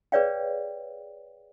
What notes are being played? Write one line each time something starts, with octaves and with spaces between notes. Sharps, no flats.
G#4 B4 C#5 D5 F5 G5